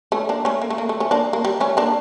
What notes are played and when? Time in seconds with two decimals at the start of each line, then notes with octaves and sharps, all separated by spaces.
0.12 A3 C#4
0.29 A#3 D4
0.45 A3 C#4
0.62 A#3
0.70 A3
0.78 A#3
0.89 A3
1.00 A3 C#4
1.11 A#3 D4
1.33 A#3
1.45 G3
1.60 A3 C#4
1.77 A#3 D4